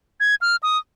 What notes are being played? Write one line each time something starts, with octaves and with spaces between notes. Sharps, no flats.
G#6
F6
D#6